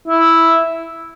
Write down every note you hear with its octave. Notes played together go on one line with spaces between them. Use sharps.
E4